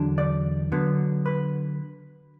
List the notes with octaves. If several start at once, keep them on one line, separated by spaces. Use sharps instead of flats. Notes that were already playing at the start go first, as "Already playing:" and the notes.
Already playing: E2 D3 F#3 D4
D5
D3 F#3 B3
B4